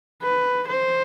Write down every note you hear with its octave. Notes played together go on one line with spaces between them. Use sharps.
B4
C5